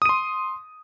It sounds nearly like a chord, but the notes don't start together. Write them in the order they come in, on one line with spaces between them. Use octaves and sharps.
D#6 D#7 C6